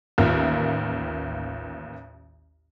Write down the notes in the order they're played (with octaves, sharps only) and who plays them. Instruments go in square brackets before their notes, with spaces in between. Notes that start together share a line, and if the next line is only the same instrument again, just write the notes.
[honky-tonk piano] A1 D#2 F4 A#4 E5 F6